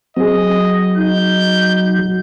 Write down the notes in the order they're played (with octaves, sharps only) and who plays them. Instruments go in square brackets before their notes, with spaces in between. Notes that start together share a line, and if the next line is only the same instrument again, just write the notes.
[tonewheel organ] F#3 [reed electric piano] C4 G#4 [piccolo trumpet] D#5
[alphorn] D#4 [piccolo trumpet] G6